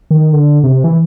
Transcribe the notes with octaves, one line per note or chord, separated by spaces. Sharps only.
D#3
D3
C3
E3